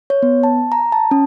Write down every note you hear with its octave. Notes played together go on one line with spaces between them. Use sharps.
C#5
B3
A5
A#5
A5
C#4